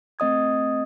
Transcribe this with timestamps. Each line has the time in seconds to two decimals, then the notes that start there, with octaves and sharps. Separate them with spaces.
0.19 A3 C4 D#5 D#6 G#6